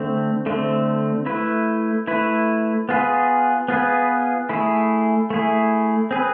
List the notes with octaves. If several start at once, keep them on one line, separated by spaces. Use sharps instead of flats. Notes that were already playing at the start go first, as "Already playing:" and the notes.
Already playing: D3 A3 C4
D3 A3 C4
A3 E4 B4
A3 E4 B4
B3 F4 G#4 B4
B3 F4 G#4 B4
A3 E4 G#4
A3 E4 G#4
C4 G#4 B4